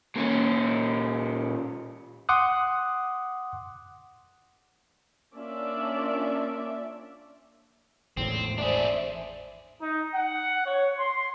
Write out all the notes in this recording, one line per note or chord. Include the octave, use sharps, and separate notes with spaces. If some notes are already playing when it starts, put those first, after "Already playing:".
A#2 C#4
F#5 C6 D6 D#6 F#6
A#3 C#4 D4 F4 D5 E5
G#1 E2 A2 C4
D4 G#4 C5 D5 E5
D#4
F#5
C#5
C6